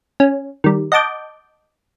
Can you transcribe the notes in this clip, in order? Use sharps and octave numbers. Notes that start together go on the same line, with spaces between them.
C#4
D#3 G3
D#5 F#5 A5 D6 G6